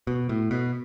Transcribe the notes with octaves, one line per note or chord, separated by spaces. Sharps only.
B2
A2
B2